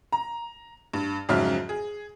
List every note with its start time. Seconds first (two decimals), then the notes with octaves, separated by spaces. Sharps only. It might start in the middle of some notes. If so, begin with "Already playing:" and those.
0.12 A#5
0.94 G2
1.29 F2 G#2 C#3 F#3 E5 F6
1.69 G#4